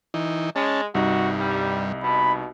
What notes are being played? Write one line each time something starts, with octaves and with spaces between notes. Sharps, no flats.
E3 D#4
G#3 C#4 A5
C2 G2 D#4 F#4
G3
B2 B5